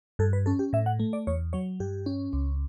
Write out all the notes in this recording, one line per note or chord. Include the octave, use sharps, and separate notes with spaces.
G2 A4
B4
C#4 A4
G4
A2 E5
F#5
A3
D5
E2 C#5
F#3 C#5
G2 G4
C#4
C#2